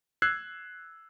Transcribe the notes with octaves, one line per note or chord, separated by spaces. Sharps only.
E6 F#6 G#6 C7